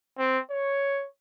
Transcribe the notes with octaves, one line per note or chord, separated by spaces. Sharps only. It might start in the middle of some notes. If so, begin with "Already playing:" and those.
C4
C#5